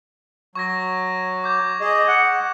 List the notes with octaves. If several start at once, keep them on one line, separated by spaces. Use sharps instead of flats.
F#3 C#6 G#6 A#6
D6 G6 G#6
G#4 D#5
F#5